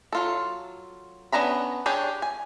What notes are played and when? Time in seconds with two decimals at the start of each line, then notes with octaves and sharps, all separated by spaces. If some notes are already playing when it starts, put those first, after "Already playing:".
0.12 F#3 F4 A4
1.32 B3 C#4 D4 A#5 B5
1.86 D4 G4 G#4 C#5
2.22 G#5